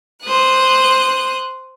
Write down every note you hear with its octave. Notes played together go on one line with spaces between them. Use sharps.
C5 D#6 F#6